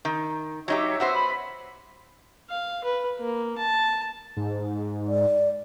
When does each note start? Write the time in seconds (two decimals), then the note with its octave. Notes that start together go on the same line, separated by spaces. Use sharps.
0.05 D#3
0.68 F#3 D#4 G4 C#5 E5
1.00 B3 F#4 C5 E5
1.13 B5
2.50 F5
2.84 B4
3.18 A#3
3.58 A5
4.37 G#2
5.08 D5